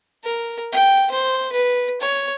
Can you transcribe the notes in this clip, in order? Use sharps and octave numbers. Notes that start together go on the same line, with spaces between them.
A#4
G5
C5
B4
C#5